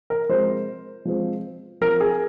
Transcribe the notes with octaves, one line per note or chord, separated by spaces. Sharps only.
A#4
F3 G#3 C4 C5
F3 G#3 C4
F3 C4 A#4
G#4